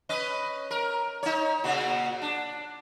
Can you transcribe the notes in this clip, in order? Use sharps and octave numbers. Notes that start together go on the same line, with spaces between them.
C#4 B4 D#5
A#4
D#4 C#5
A#2 C#3 F#4
D4